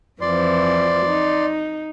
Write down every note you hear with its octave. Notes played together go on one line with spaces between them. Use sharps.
F2 E3 F3 D5 C6
D#4